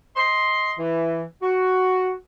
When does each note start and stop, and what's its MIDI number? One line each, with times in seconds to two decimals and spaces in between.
0.16 0.74 75
0.16 0.74 84
0.80 1.22 52
1.43 2.11 66